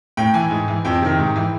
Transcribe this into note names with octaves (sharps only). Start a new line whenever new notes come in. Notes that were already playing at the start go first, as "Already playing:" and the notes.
A2 G5
E3 G#5
G#2
E3
F2 G5
C3 D#3
G#2
E3